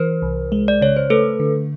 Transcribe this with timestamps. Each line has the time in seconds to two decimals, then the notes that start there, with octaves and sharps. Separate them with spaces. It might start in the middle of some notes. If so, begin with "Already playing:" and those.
Already playing: E3 A#4 C5
0.22 C2
0.52 G#3
0.68 D5
0.81 C#3 C#5
0.96 C5
1.10 A3 A4 B4
1.40 D3